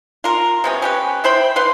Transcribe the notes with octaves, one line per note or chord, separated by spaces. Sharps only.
F4 A#4
C3 B3 C#4
C#4 G4 B4
E4 C5 G5 B5
B4 F5 C6